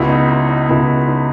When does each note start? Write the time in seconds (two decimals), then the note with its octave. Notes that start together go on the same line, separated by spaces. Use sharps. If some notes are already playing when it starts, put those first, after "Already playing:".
Already playing: C#2 B2 E4
0.09 D#4
0.29 E4
0.49 D#4
0.68 C#2 B2 E4
1.08 D#4